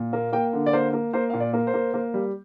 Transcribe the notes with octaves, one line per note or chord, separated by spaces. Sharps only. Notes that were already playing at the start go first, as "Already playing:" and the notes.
Already playing: A#2
A#3
A#3 G5
D3
D5
A#3 C5
A#3
A#3 C5
A#2 F5
D5
A#3
C5
A#3
A#3
G3